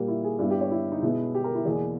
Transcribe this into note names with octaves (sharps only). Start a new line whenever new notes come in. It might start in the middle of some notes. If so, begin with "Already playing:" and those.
Already playing: A#2 G3 A#3 G4
E4
G#4
G2 G3 B3 E4
G4
C#5
E4
D#4
B2 G#3 B3 E4
G4
A#4
E4
E2 B2 A#3 G#4